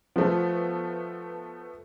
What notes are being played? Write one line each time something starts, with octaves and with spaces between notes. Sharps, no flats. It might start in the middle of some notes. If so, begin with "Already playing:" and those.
F3 A3 B3